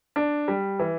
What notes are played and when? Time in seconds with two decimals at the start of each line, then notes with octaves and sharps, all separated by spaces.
0.16 D4
0.48 G3
0.79 E3